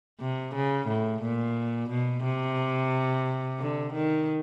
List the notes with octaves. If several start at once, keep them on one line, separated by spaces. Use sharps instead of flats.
C3
C#3
A2
A#2
B2
C3
D3
D#3